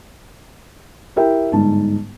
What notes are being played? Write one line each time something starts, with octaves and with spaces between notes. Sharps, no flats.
E4 G4 A#4 E5 G5
G1 G#2 A5